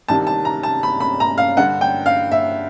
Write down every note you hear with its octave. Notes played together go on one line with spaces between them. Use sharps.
C2 C3 D#3 A5
A5
A#5
A5
B5
B5
A#5
F5
G2 D3 F#5
G5
F5
E5